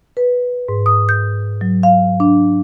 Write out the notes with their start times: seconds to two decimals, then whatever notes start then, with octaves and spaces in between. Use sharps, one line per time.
0.17 B4
0.68 G#2
0.86 D#6
1.09 G6
1.61 F#3
1.83 F5
2.20 D4